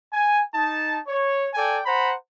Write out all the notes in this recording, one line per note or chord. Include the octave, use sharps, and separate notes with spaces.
G#5
D#4 A5
C#5
A4 D5 G5 G#5
C5 F#5 A#5 B5